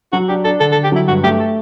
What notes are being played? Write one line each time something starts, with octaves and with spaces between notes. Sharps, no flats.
F#3 F#4
D4 G4
D4 A4
D3 A4
A4
D3
G4
F#3 E4
G2 F#4
A3 G4
A4